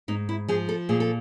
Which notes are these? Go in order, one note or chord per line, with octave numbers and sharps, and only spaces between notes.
G#2 D#4
E4
F3 G#4
A4
A#2 G#4
A4